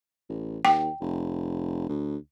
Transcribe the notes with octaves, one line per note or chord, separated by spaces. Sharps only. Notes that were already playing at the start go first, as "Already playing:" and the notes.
A1
D#2 G5
F1
D2